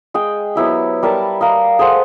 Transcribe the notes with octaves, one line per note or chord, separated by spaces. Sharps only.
G#3 G#4 G5
F#3 B3 E4 G4
G3 A#4 B4 A5
D#5 F5 A#5
G#4 A4 C5 F#5